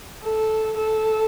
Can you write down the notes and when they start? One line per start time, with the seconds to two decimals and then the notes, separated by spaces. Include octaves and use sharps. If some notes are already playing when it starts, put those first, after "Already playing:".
0.23 A4
0.77 A4